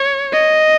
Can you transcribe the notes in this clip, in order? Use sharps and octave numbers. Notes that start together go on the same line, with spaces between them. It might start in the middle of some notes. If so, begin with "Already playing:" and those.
Already playing: C#5
D#5